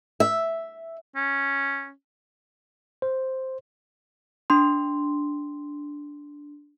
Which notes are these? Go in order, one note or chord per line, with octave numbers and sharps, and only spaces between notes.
E5
C#4
C5
D4 C6